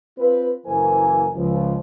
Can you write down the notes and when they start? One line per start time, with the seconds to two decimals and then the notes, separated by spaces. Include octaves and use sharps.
0.18 C4 F4 B4
0.66 F#1 E3 A#3 A#4 C5 G#5
1.34 C#2 F3